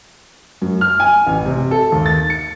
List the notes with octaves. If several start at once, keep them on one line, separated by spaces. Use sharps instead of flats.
F#2
F6
G#5
A1
C3
A4
D#2
A6
C#7